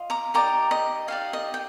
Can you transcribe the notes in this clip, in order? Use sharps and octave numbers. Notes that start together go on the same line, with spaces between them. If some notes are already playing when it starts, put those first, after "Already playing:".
Already playing: F4 D#5
A#5 D6
D#4 G4 D5 A#5 D6
D#5
D#4 G4 D5 F5
D#5
G5